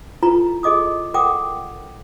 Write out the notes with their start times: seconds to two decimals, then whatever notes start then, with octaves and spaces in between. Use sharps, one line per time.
0.22 E4 F4 A4 B4 A#5 B5
0.63 G#4 A4 D#5 D6 D#6
1.14 A4 A#4 F#5 G5 D6 D#6